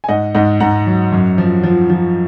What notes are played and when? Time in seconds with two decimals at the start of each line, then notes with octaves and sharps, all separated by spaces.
0.04 G#5
0.08 G#2 D#5 F#5
0.35 G#2 D#5 F#5
0.60 G#2 F#5 A#5
0.87 F#3
1.12 F#2
1.38 F3
1.63 F3
1.90 F3